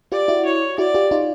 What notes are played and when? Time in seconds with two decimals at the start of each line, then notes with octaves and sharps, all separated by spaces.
0.12 F4 G4 D5
0.28 E4 F#4
0.45 C#5
0.78 E4 F#4 D5
0.94 F4 G4
1.11 D#4 F4